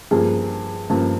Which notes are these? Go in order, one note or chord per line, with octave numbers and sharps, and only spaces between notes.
G2 F3 A#3 G#4
G2 F3 A#3